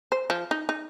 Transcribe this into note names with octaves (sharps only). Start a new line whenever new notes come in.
C5
F3
D#4
D#4